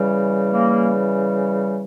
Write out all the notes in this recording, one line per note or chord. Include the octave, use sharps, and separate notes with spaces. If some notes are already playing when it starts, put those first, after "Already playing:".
Already playing: C#3 E3 G3
A#3